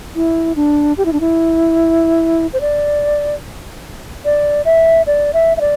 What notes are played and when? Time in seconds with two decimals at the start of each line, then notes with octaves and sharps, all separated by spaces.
0.15 E4
0.56 D4
0.97 G4
1.05 E4
1.13 D4
1.20 E4
2.53 C5
2.61 D5
4.25 D5
4.65 E5
5.07 D5
5.34 E5
5.57 E5
5.61 D5